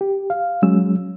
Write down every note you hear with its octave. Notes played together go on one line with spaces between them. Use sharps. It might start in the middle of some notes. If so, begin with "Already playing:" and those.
G4
F5
F#3 G#3 C#4 E6